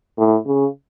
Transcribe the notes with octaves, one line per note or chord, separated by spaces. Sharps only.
A2
C#3